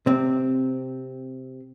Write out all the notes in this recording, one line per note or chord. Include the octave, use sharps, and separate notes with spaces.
C3 C4